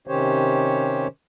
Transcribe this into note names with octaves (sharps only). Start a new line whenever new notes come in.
C3 D#3 C#4 G4 C5 C#5